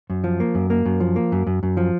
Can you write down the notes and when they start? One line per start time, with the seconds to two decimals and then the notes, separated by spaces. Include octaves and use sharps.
0.10 F#2
0.24 F3
0.40 A#3
0.55 F#2
0.70 A#3
0.85 F#2
1.00 F3
1.16 A#3
1.32 F#2
1.47 F#2
1.63 F#2
1.77 F3